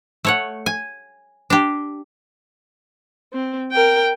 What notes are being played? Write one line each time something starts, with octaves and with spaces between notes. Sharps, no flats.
A3 C#5 F#5
G#5
D4 G4
C4
A#4 G5